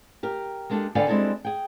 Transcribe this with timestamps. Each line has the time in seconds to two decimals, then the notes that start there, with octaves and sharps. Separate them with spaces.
0.23 G4 A#4
0.70 G#3 A#3 D4 F4 G4 A4
0.95 D3 B3 D5 F5 G5 G#5
1.07 G3 G#3 C4 D4 E4 A4
1.45 G#4 G5